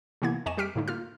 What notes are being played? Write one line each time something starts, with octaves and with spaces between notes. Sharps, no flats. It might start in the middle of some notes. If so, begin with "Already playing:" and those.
C3 E3 A#3 B3 E4 G#6
F2 D#5 G#5 C#6 E7
G3 G4 F6 B6 D7
A2 D3 A3 D#4
A#3 F4 F6